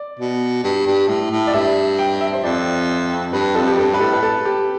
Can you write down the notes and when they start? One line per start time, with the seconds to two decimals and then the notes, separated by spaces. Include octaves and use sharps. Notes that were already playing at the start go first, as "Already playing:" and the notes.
Already playing: D5
0.19 B2
0.64 G2
0.87 G2
1.08 A2
1.31 A2
1.47 D5
1.53 G2 E5
1.99 G5
2.21 E5
2.33 C5
2.43 F2 D5
3.32 G2 B4
3.55 F2 A4
3.67 G4
3.78 G2 A4
3.94 B4
4.00 A2 A4
4.13 B4
4.23 A4
4.45 G4